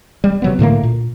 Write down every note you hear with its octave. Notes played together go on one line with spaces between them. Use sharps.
G3
C3 F#3 B3
A2 D3 A3 A#3
A#2